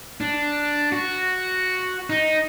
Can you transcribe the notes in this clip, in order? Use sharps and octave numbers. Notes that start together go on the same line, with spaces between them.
D4
F#4
D#4